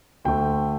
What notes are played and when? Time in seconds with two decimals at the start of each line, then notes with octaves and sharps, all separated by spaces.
0.25 D2 D3 A3 G5